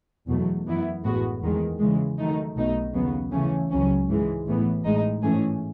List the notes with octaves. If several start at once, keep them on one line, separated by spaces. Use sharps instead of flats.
E2 B2 F#3 A3
F#2 E3 B3 E4
A1 A2 G#3 B3 F#4
E2 D#3 G#3
C#3 E3 G#3
D#3 F#3 A3 D#4
B1 B2 A3 D#4
D#2 C#3 F#3 B3
C#3 E3 A3 C#4
C#2 C#3 F#3 C#4
G#2 E3 G#3
A1 A2 E3 B3
A1 A2 G#3 D#4
G#2 E3 A3 C#4 G#4